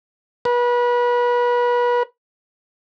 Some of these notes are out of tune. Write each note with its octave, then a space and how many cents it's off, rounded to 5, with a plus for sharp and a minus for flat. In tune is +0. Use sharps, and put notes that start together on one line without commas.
B4 -30